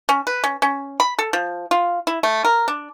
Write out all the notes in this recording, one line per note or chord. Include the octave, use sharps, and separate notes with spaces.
C#4
B4
C#4
C#4
B5
A4
F3
F4
E4
A3
A#4
D4